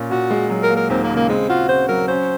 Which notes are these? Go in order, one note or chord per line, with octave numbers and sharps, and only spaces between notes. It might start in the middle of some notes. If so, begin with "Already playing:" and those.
Already playing: A#2 C#4
A#2 F#4
G#3
F#3
A#4
A#3
A#4
D#2 C4
A#3
C#3
A#3
G#3 C4
F4 F#4
C#3 C5
F#3 A#4
C#4 C5